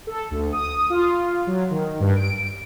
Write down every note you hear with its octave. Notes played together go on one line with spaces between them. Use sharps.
A4
D2
D#6
F4
F#3
D#3
G2
D7